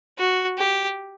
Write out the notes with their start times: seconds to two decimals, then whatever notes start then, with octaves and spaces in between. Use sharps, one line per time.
0.18 F#4
0.58 G4